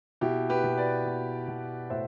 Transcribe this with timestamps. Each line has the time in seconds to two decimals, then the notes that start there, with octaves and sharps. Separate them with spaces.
0.21 B2 E4 G4
0.49 G4 B4
0.64 B2
0.78 B4 D5
1.06 B2
1.48 B2
1.90 A2 C5 E5